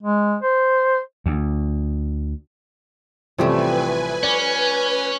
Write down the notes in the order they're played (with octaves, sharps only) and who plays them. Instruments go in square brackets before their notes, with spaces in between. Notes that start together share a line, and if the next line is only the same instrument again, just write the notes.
[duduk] G#3
C5
[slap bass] D2
[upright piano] A1 C3 E3 [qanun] F3 G3 A3 [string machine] B4 G#5
[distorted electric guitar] C#4 [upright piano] D5